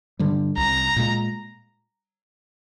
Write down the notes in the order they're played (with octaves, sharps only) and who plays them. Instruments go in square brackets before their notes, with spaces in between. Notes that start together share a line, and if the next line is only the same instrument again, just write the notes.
[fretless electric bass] G2 D3 G3
[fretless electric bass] C2 [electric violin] A#5
[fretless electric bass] A#2 G#3